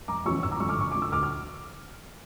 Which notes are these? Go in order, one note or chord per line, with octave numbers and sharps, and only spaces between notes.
F1 A#5 D6
E2 C#3 F3 C#4 C#6 E6
G1 C#6 E6
A#5 D6
F2 D3 C#6 E6
D6 F6
G1 C#6
F2 D3 D6
E6
D2 D6 F6
F6